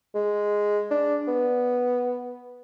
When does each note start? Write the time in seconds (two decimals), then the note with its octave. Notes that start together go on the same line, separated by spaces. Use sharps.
0.15 G#3
0.91 D4
1.28 B3